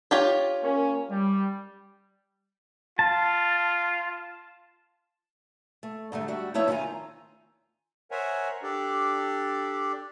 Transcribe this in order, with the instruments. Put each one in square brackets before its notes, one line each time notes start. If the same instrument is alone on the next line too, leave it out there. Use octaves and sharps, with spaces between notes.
[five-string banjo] F4 G4 C#5
[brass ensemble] A#3 C#4
G3
[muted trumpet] F4 [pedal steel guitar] A5
[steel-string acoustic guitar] A3
G#2 D3 G3 A3
G3 F#4 E5
F2 A3 B3 E4 C#5 E5
D#3 E4 F4 G#5 A#5
[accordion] A#4 C5 C#5 E5 F#5 G#5
D4 G4 A4 D5